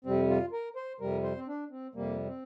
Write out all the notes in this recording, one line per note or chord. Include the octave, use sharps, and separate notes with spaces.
F2 C3 G3 C4
F4
A#4
C5
F2 C3 G3 A#4
C5
C4
D4
C4
F2 C3 G3 A#3
C4